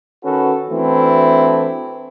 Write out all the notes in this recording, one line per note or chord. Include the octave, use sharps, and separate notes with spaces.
D#3 C#4 F#4 A4 B4
E3 A3 C4 D4 E4 F#4